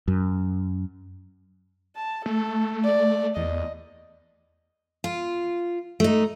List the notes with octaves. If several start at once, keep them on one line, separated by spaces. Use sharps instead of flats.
F#2
A5
A3 A4
D5
E2 D#5
F4
A3 D#4